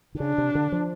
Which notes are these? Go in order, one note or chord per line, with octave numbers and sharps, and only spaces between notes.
D3
C#3 D4
C3
D3
F3